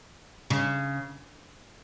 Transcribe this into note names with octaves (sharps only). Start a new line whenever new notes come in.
C#3